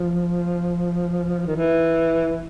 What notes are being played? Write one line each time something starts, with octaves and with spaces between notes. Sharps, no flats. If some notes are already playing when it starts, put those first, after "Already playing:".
Already playing: F3
D#3
E3